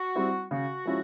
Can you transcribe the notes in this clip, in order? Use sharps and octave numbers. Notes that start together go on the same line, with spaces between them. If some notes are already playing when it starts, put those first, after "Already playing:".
Already playing: F#4
G3 C4 E4
C#3 F#4
F3 G#3 C#4 E4